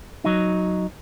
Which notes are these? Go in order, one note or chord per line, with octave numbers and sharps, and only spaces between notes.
F#3 D#4